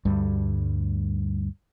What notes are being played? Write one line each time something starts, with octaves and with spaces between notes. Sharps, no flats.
D2 G2 G3